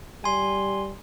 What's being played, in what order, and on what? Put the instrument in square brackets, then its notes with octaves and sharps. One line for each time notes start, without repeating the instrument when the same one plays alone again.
[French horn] G3 [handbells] G#5 C6